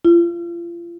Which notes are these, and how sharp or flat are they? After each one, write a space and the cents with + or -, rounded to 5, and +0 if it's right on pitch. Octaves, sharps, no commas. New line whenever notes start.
F4 -35